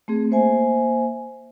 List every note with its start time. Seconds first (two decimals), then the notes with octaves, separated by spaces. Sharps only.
0.08 A3 C4 G#4
0.31 A#3 C5 E5 G#5